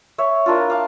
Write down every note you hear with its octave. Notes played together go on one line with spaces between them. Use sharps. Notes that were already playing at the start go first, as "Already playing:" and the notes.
C#5 E5
A#3 D4 E4 F4
F5 A5 D6